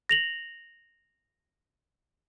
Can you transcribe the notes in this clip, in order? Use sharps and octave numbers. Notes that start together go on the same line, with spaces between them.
A#6 F7 F#7